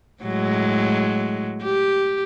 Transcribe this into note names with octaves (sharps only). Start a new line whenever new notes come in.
A2 F#3 G#3
G4